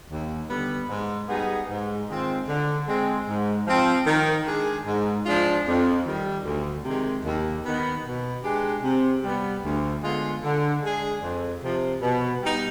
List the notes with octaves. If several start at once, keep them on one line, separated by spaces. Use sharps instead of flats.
D#2
D3 G3 B3
G#2
G3 B3 D#4 G#4
G#2
D#3 G#3 C4 F4
D3
G#3 C4
G#2
F3 C4
D#3
G#3 D4 G#4
G#2
F3 G#3 D4 F4
F2
D#3 G3
D2
C3 D#3 G#3
D#2
D#3 B3
B2
G#3 D4 G4
C3
G3 B3
D2
D3 G#3 B3 F4
D3
G#3 D4 G#4
F2
C3 F3
B2
G3 B3 D#4